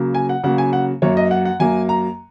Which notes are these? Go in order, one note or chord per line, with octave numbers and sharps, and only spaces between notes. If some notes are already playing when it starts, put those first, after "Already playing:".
Already playing: C#3 F#3 A#3
G#5
F#5
C#3 F#3 A#3 F#5
G#5
F#5
F#2 F#3 A#3 C#5
D#5
F#5
F#5
F#2 F#3 A#3 G#5
A#5